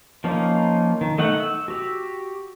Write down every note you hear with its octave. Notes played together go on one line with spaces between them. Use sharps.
F3 A#3 C#4 D#4 F4
D#3
A3 D#4 F#5
E6
F#4 G4